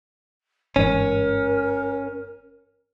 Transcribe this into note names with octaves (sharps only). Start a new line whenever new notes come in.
G1 G#2 E3 C#4 A#4